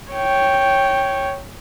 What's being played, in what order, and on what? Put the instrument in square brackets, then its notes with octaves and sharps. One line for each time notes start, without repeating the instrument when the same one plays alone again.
[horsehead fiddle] C#5 G5